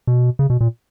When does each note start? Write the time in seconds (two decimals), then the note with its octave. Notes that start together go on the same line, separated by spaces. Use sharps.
0.07 B2
0.39 C#3
0.50 B2
0.61 A#2